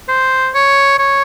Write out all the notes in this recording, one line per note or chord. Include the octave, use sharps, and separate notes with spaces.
C5
C#5
C#5